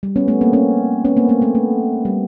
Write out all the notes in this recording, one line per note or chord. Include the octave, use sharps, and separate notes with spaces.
G3
B3 C#4
A3 B3
A#3 C4
B3 C#4
B3 C#4
A#3 C4
A3 B3
A3 B3
A3
G3